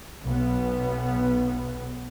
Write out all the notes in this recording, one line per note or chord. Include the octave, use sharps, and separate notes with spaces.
B1 B3